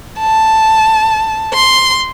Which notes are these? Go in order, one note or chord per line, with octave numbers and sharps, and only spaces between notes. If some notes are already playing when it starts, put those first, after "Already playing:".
A5
C6